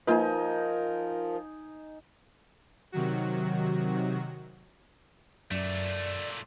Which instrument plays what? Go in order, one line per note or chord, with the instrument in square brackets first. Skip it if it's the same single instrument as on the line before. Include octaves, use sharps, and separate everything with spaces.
[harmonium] F3 [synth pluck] A#3 F4 B4 [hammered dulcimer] D#4 G#5 [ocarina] A#4
[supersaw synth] C3 D#3 F#3 F#4
[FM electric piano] F#2 [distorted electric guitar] A#2 A3 [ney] D5